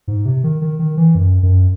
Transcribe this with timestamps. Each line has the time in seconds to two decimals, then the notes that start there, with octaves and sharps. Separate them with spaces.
0.08 G#2
0.26 C3
0.44 D#3
0.62 D#3
0.79 D#3
0.97 E3
1.15 F#2
1.43 F#2